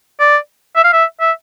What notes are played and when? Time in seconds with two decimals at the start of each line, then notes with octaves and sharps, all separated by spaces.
0.20 D5
0.76 E5
0.84 F5
0.93 E5
1.20 E5